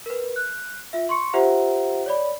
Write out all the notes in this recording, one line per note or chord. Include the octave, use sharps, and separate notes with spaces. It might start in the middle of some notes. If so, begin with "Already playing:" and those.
A#4 B4
F#6
F4 E5
C6 C#6 C#7
F4 G4 C5 E5 F#5 A#5
C#5 D5 B5